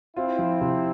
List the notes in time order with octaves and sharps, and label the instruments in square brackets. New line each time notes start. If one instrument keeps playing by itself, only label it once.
[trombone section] C4 E4 [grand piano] F4
[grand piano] F3
C3